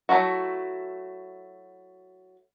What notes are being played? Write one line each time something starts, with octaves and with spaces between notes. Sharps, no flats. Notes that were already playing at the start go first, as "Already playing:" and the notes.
F#3 A3 B3 E4 F#4